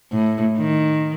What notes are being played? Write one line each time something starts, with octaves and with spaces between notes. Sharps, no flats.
A2
D#3